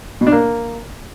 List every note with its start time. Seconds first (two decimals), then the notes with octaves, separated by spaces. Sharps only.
0.21 B2
0.27 D4
0.32 A#3